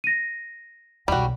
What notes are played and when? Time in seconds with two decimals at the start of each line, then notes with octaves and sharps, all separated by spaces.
0.04 A#6 D#7
1.08 B1 E2 G3 F#4 G5